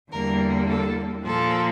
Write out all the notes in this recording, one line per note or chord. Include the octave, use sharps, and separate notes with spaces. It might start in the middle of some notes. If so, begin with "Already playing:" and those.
E2 D3 G3 A#3 A#4
A4
A#2 F3 A#3 A4